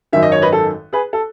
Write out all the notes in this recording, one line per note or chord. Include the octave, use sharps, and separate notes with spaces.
G#1 F#2 D#3 E5
D#5
C#5
B4 D#5
A4
G#4 B4
A4